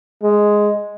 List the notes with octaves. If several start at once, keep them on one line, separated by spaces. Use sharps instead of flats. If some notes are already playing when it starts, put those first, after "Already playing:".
G#3